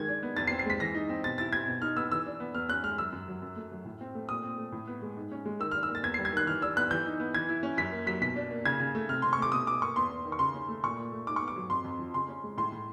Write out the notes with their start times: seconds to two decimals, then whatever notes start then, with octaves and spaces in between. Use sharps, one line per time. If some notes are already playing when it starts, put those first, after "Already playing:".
Already playing: D#3 G#3 G#6
0.08 D4
0.23 B3
0.37 E2 A6
0.47 C7
0.51 C4
0.59 C7
0.66 G#3 B6
0.80 E3 A#6
0.95 D#4
1.09 C4
1.23 B2 A6
1.38 E4 A6
1.53 C4 G#6
1.68 B2
1.82 D#4 F6
1.97 B3 E6
2.12 E3 E6
2.26 D4
2.40 B3
2.55 E2 F6
2.69 C#4 F#6
2.83 G#3 F6
2.98 F#2 E6
3.12 F#2
3.28 F#3
3.42 F#2
3.56 A3
3.71 F#3
3.85 A2
4.01 C4
4.15 A3
4.29 A#2 D#6
4.43 C4
4.58 A3
4.72 A2
4.87 B3
5.02 G#3
5.17 G#2
5.32 C#4
5.45 G#3
5.59 D#3 E6
5.71 D4 F6
5.83 E6
5.89 A#3
5.95 A6
6.03 E2 G#6
6.14 C7
6.18 G3
6.25 G#6
6.32 D#3 F#6
6.47 E3 F6
6.62 D4 E6
6.76 B3 F#6
6.90 E3 G6
7.06 D#4
7.20 B3
7.35 E3 G#6
7.49 E4
7.63 C#4
7.77 F#2 B6
7.92 A#3
8.06 F#3 B6
8.21 B2 B6
8.36 D4
8.51 A#3
8.66 C#3 G#6
8.80 C#3
8.95 A3
9.09 C3 F6
9.22 C3 C6
9.33 C#6
9.38 A3 D6
9.52 B2 D#6
9.67 B2 D6
9.82 A#3 C#6
9.96 E2 C6
10.11 E2
10.25 D#3
10.32 C#6
10.39 C#3 C6
10.55 C#4
10.69 A3
10.83 A#2 C#6
10.98 A#2
11.12 A3
11.27 G#2 D6
11.36 C#6
11.42 B3
11.48 D6
11.56 F#3
11.70 F2 C6
11.84 F2
11.99 F3
12.14 C#3 C6
12.29 C#4
12.44 G#3
12.57 A2 C6
12.72 A2